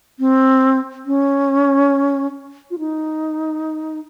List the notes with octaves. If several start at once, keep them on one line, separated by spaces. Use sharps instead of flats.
C4
C#4
F4
D#4